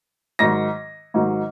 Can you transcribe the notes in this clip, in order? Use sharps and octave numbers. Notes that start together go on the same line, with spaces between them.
G#2 D#3 F#3 A#6
G#2 D#3 F#3